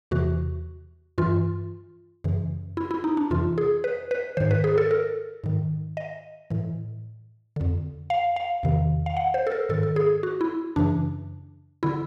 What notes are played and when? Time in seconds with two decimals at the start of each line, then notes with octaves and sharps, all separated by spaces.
0.11 E2 C3 E3 F#4
1.18 G2 E3 F4
2.24 F#2 C#3 E3
2.77 E4
2.91 E4
3.04 D#4
3.17 D4
3.31 F2 C3 E3 F4
3.58 G#4
3.84 B4
4.11 B4
4.37 G#2 D#3 C5
4.51 B4
4.64 G#4
4.78 A4
4.91 A#4
5.44 G#2 D#3
5.97 D#5
6.50 A2 E3
7.56 F2 D3
8.10 F5
8.36 F5
8.63 E2 C3 D#3
9.06 F5
9.17 F#5
9.34 C5
9.47 A4
9.52 A#4
9.69 G#2 D#3 A4
9.83 A4
9.96 G#4
10.23 F#4
10.41 E4
10.76 F#2 C#3 E3 D4
11.83 D3 E4